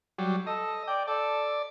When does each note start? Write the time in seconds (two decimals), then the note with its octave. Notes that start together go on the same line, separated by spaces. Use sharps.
0.18 F#3 G3
0.47 A4 D#5
0.88 D5 G5
1.07 A4 D5